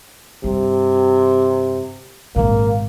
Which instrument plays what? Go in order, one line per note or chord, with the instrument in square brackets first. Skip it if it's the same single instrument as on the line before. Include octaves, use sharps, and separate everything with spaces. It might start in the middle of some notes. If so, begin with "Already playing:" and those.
[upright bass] G2 [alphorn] C3
[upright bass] G#1 A#2 [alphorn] A#3